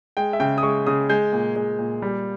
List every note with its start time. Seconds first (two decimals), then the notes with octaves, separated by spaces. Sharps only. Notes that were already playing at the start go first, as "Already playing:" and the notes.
0.17 G#3 G5
0.33 E5
0.40 C#3 G5
0.58 D#6
0.63 G#3 C#6
0.86 C#3 D#6
1.09 G#3 G6
1.33 A#2
1.56 G#3
1.79 A#2
2.02 G3